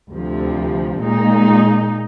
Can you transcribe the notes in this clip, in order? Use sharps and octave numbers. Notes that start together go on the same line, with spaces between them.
D2 C3 F3
A#2 G#3 D#4